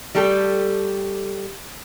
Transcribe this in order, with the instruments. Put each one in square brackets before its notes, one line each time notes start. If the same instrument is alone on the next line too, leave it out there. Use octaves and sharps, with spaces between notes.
[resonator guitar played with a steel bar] G3 A3 G4 A4